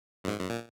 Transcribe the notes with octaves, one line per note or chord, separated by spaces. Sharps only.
F#2
G#2
F#2
A#2